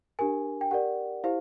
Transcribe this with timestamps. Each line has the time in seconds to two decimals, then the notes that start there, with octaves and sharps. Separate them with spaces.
0.19 D4 G4 A#4 G#5
0.61 G5
0.71 G4 A#4 D5 F#5
1.24 E4 G4 C5 F5